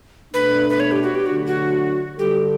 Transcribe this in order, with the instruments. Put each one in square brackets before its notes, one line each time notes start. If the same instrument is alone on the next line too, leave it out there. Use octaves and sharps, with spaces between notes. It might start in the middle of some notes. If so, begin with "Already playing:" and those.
[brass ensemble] B2 A3 D4 [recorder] B4
[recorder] B4
C#5
G4
F#4
G4
[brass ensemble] D3 F#3 A3 D4 [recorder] F#4
[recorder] F#4
[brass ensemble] D3 G3 D4 A4 [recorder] G4